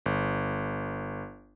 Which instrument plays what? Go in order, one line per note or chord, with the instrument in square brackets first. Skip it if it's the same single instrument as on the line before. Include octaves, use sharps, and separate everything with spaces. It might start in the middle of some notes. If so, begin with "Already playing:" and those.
[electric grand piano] G1